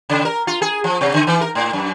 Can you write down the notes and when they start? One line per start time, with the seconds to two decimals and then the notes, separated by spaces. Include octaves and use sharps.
0.09 C#3
0.25 A#4
0.47 F4
0.62 G#4
0.84 F3
1.01 C3
1.14 D3
1.27 E3
1.41 A#4
1.55 A2
1.73 F#2